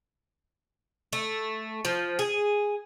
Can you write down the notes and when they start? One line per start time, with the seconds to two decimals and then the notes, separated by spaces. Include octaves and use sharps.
1.13 A3
1.85 F3
2.19 G#4